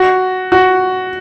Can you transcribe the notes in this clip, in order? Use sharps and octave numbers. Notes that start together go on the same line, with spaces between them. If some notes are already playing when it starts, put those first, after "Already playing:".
Already playing: F#4
F#4